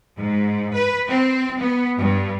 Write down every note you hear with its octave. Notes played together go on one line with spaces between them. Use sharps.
G#2
B4
C4
B3
G2